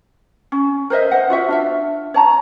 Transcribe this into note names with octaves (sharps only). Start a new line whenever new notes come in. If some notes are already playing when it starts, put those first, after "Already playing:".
C#4
A#4 C5 D#5 E5
C5 F#5
F4 F#4 E5
D4 F4 E5
C#5 A5 A#5